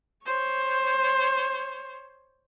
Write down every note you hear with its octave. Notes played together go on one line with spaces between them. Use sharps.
C5 C#5